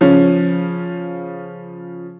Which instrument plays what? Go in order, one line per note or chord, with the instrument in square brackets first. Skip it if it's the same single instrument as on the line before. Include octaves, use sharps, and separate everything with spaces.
[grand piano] C#3 F3 C#4